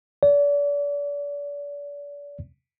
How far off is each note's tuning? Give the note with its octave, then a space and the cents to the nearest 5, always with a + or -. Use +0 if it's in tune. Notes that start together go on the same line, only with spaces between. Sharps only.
D5 -35